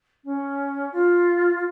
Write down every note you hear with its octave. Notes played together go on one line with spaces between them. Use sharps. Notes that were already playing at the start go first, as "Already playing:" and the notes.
C#4
F4
F4